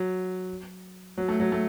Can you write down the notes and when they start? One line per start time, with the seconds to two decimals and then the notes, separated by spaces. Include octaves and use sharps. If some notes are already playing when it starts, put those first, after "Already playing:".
Already playing: F#3
1.18 F#3
1.28 A3
1.40 F#3
1.52 A3